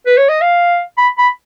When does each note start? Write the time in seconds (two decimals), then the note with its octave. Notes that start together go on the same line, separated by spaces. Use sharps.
0.06 B4
0.17 C#5
0.29 D#5
0.41 F5
0.98 B5
1.18 B5